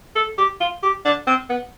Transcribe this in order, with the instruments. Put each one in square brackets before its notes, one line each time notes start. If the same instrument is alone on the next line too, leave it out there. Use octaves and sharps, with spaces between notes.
[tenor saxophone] A4
G4
F4
G4
D4
C4
B3